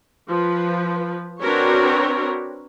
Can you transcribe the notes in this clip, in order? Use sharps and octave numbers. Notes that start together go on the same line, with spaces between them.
F3 B4
C4 D4 F#4 A#4 B4 C#5